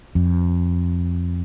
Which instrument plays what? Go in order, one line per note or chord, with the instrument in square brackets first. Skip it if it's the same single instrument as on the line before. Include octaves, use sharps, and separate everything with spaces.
[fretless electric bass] F2